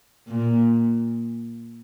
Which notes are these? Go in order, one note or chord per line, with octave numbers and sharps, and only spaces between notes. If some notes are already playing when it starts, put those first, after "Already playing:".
A#2